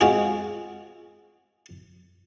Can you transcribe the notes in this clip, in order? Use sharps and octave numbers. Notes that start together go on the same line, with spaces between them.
G#3 C4 F4 F#4 G#4